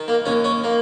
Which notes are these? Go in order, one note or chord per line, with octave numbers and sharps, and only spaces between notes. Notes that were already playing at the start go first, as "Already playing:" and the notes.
Already playing: D#3
A#3
D#2 C#4
C#4
A#3